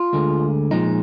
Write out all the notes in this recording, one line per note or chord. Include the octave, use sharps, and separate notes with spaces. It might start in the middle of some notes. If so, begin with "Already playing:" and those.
Already playing: F4
D2 D3 G#3
A#2 F3 G#3 D#4